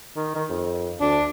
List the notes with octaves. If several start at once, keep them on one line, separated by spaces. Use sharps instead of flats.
D#3
D#3
F2
D2 D4